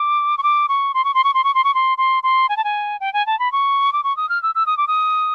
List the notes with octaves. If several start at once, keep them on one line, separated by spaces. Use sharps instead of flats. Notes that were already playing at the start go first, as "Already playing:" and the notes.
Already playing: D6
C#6
D6
C#6
C6
C#6
C6
C#6
C6
C#6
C6
C#6
C6
C6
C6
G#5
A5
G#5
G5
G#5
A5
B5
C#6
D6
C#6
D#6
F6
E6
E6
D#6
D6
D#6